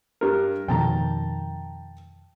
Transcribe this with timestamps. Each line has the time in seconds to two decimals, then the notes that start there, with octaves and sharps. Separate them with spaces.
0.21 G2 A#4
0.68 F2 B2 D#3 G5 A5 A#5